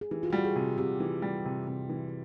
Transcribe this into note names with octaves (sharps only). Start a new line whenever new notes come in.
G#4
E3 G4
F4
G3 F#4
G4
G#4
C3
C3 G4
E3
G3
C3
C3
E3